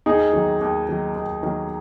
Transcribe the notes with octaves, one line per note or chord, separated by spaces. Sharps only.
D#2 D#4 G#4
D#3 F#3
D#2
D#3 F#3
D#2
D#3 F#3